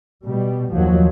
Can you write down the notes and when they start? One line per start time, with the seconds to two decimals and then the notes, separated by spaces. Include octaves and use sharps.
0.25 B2 G3
0.73 D#2 F3 F#3